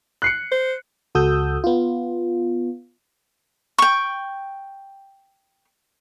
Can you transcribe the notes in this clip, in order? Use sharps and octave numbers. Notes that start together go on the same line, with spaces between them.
F#6 C7 C#7
C5
C#2 F#4 A4 D#6 E6 G6
B3 F4
G5 C#6